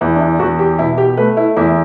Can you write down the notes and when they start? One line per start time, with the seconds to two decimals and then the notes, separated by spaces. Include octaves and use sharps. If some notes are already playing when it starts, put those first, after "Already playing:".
0.01 E2 E4
0.16 D4
0.20 E4
0.39 E2 F#4
0.59 G4
0.79 B2 E4
0.98 G4
1.17 A3 B4
1.37 E4
1.57 E2 E4